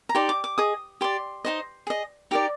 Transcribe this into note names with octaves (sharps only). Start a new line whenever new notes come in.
A#5
D#4 G4 D5 C6
D6
D6
G#4 D#5 D#6
G4 D5 C6
D#4 G#4 C5 D#5
G#4 D#5
D#4 G4 A#4 D5